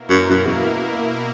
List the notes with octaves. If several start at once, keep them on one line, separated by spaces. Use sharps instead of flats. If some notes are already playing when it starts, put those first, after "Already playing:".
Already playing: B2 A#3 E4 A#4
F#2
F#2
E2